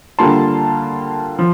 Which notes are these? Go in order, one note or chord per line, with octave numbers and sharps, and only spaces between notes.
D3 G3 A#3 F4 A5 C6
F3